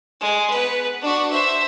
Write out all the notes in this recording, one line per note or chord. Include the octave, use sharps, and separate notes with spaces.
G#3
B3 B4
D4 F#4
C5 E5